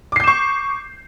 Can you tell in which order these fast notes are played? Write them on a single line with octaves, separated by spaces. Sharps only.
D6 C7 G6 E7 C#6